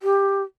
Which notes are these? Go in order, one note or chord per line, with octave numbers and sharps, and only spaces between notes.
G4